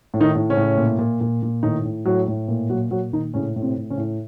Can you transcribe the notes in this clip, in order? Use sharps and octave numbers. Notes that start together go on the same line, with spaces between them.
A2
D#3 D#4
A2
C#3 C#4
A2
A#2
A#2
A#2
A#2
A2 D#3 D#4
A2
A2 F#3 F#4
A2
A#2
A#2 F#3 F#4
A#2 F#3 F#4
A#2 D#3 D#4
A2 C#3 C#4
A2
C3 C4
A2
C#3 C#4
A2